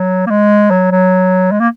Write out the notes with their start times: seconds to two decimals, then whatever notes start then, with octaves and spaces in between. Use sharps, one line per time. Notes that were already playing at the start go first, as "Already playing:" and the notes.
Already playing: F#3
0.27 A#3
0.30 G#3
0.70 F#3
0.91 F#3
1.51 G#3
1.60 A#3